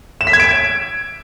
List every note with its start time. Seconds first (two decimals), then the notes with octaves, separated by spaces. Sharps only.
0.21 E7
0.27 B6
0.33 G#6
0.40 D7